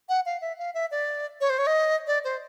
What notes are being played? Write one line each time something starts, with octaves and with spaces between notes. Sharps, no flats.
F#5
F5
E5
F5
E5
D5
C#5
C5
C#5
D#5
D5
C5